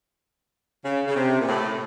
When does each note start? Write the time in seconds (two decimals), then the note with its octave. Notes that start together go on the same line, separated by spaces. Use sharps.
0.85 C#3
1.07 C#3
1.16 C3
1.41 A#2
1.48 A2